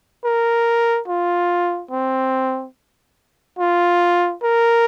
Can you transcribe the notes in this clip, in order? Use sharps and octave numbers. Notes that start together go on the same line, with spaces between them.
A#4
F4
C4
F4
A#4